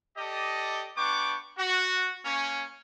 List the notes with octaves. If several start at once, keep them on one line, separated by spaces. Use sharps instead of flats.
G4 A4 D5 D#5
B3 D4 G5 C#6 D6
F#4
A#3 C#4